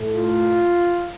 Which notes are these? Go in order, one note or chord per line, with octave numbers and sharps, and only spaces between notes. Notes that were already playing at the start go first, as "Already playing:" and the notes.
Already playing: A2 A3
F4